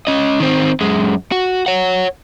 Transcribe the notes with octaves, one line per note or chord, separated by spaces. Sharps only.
C#4 D#5
D#3 C4
F#2 G#3
F#4
C#5 F#5